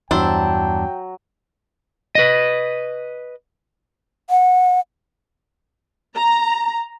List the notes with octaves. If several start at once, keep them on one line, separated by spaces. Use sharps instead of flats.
E2 G2 F#3 D4 E4 C5 G5
B4 D#5
F#5
A#5